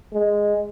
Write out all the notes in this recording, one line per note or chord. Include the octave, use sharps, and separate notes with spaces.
G#3